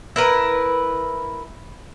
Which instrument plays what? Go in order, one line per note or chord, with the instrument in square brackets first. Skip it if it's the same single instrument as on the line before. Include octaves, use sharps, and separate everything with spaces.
[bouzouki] E4 A#4 B4